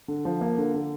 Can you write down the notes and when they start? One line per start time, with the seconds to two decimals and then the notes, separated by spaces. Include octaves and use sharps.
0.08 D3
0.25 F3
0.41 A#3
0.58 D3
0.74 D3